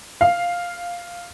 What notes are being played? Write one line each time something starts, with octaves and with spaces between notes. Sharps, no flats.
F5